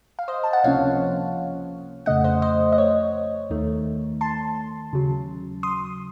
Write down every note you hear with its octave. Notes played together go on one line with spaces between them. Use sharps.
F5
C5 D#5
A5
F#5
C#2 C3 F3 A#3 C#4 C#5 F5
F2 C#3 A3 D#5 F#5
C5 D#5
C5 D#5
D#5
C#5
D#2 D#3 A3
A5 C6
D#2 C#3 F#3
C6 D#6